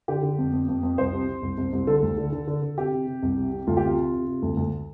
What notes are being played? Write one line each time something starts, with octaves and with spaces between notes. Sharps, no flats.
D3 G4
D3
F2
F2
F2
F2
C2 C5
C3
C3
C2
C2
C2
D3 A4
D2
D3
D3
D3
D3
C3 G4
C3
C3
C2
C3
C3
D2 F4
G4
C3 F4
C3
C3
C3
D2
D2